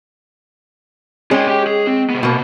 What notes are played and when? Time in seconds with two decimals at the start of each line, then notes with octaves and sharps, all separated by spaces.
1.31 G#3 C#4 G#4 G5
1.48 G4 G5
1.67 G#4
1.87 C4
2.10 C3 B3
2.23 B2 A#3